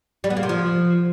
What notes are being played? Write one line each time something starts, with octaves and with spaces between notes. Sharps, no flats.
G3
B3
A#3
C3
F3